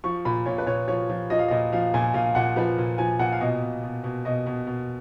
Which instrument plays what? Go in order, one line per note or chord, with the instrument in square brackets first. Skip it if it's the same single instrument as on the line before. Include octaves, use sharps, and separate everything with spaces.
[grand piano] F3 C#6
A#2 B5
A#2 C#5
B4
A#2 C#5
F3 C#5
F3
F3 D#5
F5
A#2 D#5
F3 F5
A#2 G#5
A#2 F5
A#2 F#5
F3 B4
A#2
F3 G#5
A#2 F#5
F5
B2 D#5
B2
B2
B2
B2 D#5
B2
B2